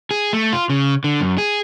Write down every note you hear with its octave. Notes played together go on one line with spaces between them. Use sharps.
G#4
A3
F4
C#3
D3
F#2
G#4